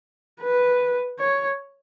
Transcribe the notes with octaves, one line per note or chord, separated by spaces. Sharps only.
B4
C#5